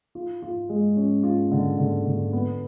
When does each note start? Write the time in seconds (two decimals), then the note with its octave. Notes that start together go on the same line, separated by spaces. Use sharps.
0.15 F4
0.42 F4
0.69 G#3
0.96 C#4
1.23 F4
1.52 D3
1.79 D3
2.06 D3
2.33 B3